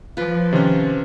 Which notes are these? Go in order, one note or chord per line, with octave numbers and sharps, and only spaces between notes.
F3 F4 B4
C3 D#3 C#4 C5